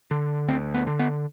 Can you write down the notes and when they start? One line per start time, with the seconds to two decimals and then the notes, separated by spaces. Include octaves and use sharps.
0.11 D3
0.48 D2 C4
0.74 B3
0.87 D3
0.99 B3